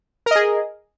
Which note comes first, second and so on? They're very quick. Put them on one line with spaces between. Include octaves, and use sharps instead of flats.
A#4 D#5 G#4